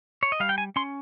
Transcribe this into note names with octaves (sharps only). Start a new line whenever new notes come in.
C#5
D#5
G3 F5
G5
G#5
C#4 C6